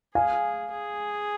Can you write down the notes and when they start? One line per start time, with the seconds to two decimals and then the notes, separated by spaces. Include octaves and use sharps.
0.15 G#4 F5 G#5
0.72 G#4